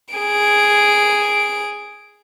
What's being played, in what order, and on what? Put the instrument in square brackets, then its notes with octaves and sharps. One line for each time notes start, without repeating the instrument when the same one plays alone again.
[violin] G#4 D7